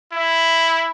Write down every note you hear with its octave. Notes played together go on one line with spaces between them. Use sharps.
E4